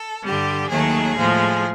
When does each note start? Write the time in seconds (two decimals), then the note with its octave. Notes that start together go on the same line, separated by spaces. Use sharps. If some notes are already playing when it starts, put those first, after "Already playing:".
Already playing: A4
0.24 G2 D3 G3 G4
0.69 D#2 D#3 F#3 A3 G#4
1.16 A2 F3 G#3